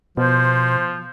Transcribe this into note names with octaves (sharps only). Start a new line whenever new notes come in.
B2 F3 C5